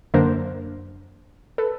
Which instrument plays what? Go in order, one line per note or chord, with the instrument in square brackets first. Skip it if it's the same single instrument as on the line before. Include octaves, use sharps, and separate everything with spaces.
[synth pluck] F#2 D3 F#3 A#3 D4 A#4 C5
A4 B4